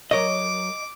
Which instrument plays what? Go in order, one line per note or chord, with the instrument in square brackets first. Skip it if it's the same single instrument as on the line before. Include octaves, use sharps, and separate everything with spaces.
[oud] F#3 A#4 C#5 [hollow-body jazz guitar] D#5 [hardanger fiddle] D6